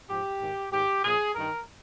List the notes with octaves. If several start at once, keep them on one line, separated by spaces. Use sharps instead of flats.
G#2 F3 G4
G#2 D#3
G#2 D#3 G4
A#2 F3 G#4
G2 D#3 A#4